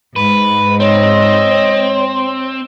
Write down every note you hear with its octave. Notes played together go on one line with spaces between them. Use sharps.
G#2 B4
C4 C#5 D#5